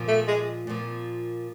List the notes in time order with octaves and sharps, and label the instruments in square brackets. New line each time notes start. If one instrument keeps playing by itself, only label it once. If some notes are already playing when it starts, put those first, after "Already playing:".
Already playing: [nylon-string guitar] A#2 F3 A#3
[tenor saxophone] A3
G#3
[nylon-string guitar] A#2 F3 A#3